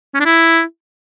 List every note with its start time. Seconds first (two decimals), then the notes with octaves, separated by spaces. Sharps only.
0.14 C#4
0.20 D4
0.25 E4